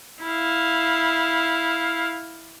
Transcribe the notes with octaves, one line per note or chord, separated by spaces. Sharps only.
E4 F5